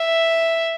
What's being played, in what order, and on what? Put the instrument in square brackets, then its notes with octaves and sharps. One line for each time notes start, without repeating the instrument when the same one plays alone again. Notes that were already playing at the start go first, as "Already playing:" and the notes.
Already playing: [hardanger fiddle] E5